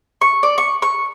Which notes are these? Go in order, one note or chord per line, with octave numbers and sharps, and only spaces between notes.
C#6
D5
C#6
C#6